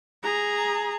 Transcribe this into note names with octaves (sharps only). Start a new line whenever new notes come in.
G#4 A#5